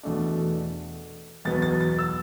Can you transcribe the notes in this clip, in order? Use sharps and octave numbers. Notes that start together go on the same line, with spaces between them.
E2 B2 A3 D4
E2 B2 F#3 B3 A6
A6
A6
E6